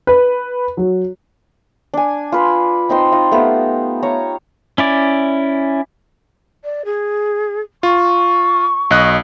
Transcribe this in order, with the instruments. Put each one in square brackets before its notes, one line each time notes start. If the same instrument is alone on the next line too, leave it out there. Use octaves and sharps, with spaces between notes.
[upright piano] B4
F#3
[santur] D4 G#5
F4 B4
C4 D#4 G5 C6
D#4 F4
A3 B3 F4 G4
C#5 F5 A#5
[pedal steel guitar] C#4 E4 D5
[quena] D5
G#4
[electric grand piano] F4 [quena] C#6
[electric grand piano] B1 D#5 F#6